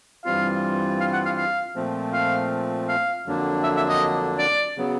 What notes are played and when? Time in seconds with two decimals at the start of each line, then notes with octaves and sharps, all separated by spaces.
0.25 G2 E3 G3 C4 F4 F5
1.01 F5
1.13 F#5
1.25 F5
1.37 F5
1.75 A#2 F3 A3 C4
2.13 F5
2.89 F5
3.26 F2 D3 F#3 A#3 D4
3.64 E5
3.77 E5
3.89 D#5
4.39 D5
4.77 C#3 F#3 B3